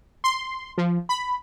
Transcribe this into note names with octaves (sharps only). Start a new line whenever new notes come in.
C6
F3
B5